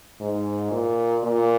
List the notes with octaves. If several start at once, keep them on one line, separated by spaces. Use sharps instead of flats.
G#2
A#2
A#2